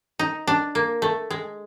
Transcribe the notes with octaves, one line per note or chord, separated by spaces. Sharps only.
D#4
D4
A#3
A3
G#3